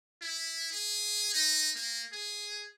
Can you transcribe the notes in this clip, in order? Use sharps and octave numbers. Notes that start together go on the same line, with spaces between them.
E4
G#4
D#4
A#3
G#4